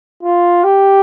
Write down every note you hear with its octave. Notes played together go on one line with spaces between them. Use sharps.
F4
G4